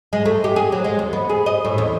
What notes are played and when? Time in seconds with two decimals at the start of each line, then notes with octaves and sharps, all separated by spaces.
0.13 G#3
0.26 A3
0.44 G4
0.56 G#4
0.72 F#3
0.84 G#3
0.99 E2
1.13 B3
1.30 G#4
1.46 D#5
1.65 A2
1.78 E2